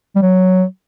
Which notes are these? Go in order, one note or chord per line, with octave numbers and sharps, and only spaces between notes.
G3
F#3